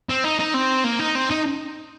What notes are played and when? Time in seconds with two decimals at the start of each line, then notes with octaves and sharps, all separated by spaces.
0.10 C4
0.24 D#4
0.40 D#4
0.54 C4
0.84 A#3
0.99 D#4
1.15 C4
1.31 D#4